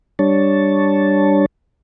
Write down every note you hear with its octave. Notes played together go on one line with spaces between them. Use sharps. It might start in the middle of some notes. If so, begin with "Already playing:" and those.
G3 D4 C#5 A5